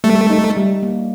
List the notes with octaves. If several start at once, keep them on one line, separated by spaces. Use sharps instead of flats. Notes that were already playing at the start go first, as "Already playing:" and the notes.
G3 A3
D#4
G3
A#3